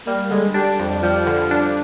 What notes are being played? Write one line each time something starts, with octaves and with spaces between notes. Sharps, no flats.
G3 A#3
D3 G#3
G3 D4
F2
F3 G3
D3
D4